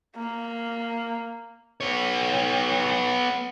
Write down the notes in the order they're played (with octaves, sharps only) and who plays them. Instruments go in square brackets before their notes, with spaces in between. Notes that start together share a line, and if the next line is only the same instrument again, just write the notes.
[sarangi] A#3
[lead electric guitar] B3 C#5